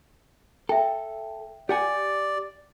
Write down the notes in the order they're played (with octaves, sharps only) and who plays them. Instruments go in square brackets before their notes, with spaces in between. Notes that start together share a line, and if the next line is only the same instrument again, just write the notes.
[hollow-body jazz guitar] A4 [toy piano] E5 G5
[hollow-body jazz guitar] G4 F#5 G#5 [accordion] D5